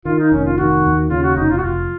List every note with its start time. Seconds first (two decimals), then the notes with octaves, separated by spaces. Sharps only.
0.05 D#3 F4
0.19 D#4
0.31 F1 C#4
0.45 F4
0.58 D#3 F#4
0.84 D#2
1.10 C#3 F4
1.23 F#4
1.36 F1 D#4
1.50 F4
1.58 F#4
1.62 F1 F4